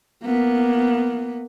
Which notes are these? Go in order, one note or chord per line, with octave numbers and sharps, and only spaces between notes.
A#3 B3